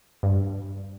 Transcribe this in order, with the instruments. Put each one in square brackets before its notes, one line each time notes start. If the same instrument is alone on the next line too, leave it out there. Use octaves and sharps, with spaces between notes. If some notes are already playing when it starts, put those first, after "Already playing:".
[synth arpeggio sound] G2